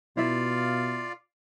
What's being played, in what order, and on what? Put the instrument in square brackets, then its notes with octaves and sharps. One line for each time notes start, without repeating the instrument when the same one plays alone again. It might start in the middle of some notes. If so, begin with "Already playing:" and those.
[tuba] B2 [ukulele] E4 E5 [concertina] F4 D5 F5